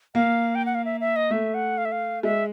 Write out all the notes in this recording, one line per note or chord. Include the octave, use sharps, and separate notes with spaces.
A#3 F5
G5
F#5
F5
E5
E5
D#5
A3 E5
F#5
F5
E5
F5
G#3 E5